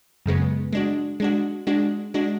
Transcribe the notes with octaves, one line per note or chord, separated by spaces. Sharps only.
F#2 C#3 G#3 B3
G#3 D4 F#4
G#3 D4 F#4
G#3 D4 F#4
G#3 D4 F#4